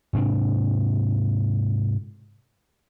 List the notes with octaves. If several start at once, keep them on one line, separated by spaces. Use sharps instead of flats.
G#2 C3 D4